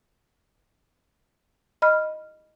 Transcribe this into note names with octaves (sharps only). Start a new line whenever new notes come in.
D#5 B5 F6